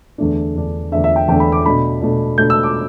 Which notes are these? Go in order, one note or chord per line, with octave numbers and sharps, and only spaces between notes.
E2 D3 A3 D4
E2 D3 A3 D4
E2 D3 A3 D4 E5
E5
G5
E2 D3 A3 D4 G5
B5
D6
B2 A3 D4 B5
B2 A3 D4
B2 A3 D4 G6
E6
D6